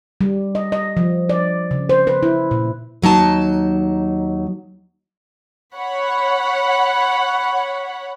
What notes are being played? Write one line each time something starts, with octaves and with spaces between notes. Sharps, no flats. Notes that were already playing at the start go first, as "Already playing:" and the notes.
G3
D#5
D#5
F3
D5
C#3
C5
B4
E4
A#2
D#2 F#3 D#4 A5
C#5 F#5 B5